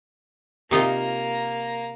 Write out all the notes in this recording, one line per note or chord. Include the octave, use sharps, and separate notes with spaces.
C3 A#3 D#4 F4 A#5